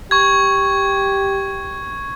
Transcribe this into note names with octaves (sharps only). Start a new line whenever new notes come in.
G4 C#6 G#6